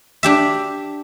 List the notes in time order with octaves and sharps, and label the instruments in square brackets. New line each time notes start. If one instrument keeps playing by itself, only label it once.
[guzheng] D4 G4 E5